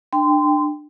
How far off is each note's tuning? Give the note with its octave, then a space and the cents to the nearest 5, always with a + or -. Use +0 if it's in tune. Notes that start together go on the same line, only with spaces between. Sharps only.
D4 +25 G5 +15 C6 -25